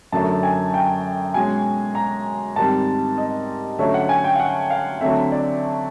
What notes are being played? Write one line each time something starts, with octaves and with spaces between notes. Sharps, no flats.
F#2 D3 F#3 A3 A5
G#5
G5
B2 G#3 C#4 G#5
A#5
G#2 D#3 G3 C4 A5
D#5
D3 F#3 A3 C#4 E5
F#5
G#5
G5
F5
F#5
F5
D3 F#3 A3 C4 E5
D5